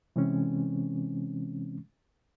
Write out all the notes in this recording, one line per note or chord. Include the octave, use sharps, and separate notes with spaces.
C3 E3 G#3 C4 C#4